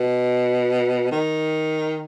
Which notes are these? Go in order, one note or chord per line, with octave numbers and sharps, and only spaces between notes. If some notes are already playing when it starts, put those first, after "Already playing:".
Already playing: B2
D#3